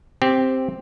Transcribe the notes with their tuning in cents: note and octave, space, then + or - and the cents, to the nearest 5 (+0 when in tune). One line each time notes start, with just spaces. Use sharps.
C4 +0 G4 +0